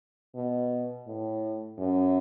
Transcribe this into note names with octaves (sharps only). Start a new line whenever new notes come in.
B2
A2
F#2